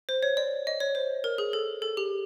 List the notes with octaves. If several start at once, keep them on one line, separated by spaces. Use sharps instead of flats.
C5
C#5
D5
D#5
C#5
C5
A#4
G#4
A4
A4
G4